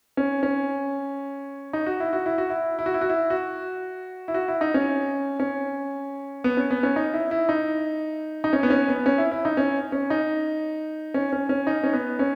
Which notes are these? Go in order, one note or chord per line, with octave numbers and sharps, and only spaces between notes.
C#4
C#4
D#4
F#4
E4
F#4
E4
F#4
E4
E4
F#4
E4
F#4
E4
F#4
E4
F#4
E4
D#4
C#4
C#4
B3
C#4
B3
C#4
D#4
E4
E4
D#4
D#4
C#4
B3
C#4
B3
C#4
E4
E4
D#4
C#4
C#4
D#4
C#4
C#4
C#4
D#4
C#4
B3
C#4